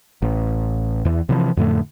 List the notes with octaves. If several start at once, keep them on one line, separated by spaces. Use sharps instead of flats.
A1
E2 E3
C3 E3 F3
F2 A2 D3 A3